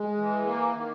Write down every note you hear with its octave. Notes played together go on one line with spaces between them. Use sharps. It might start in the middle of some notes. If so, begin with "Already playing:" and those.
Already playing: G#3
E3
A#3
D#3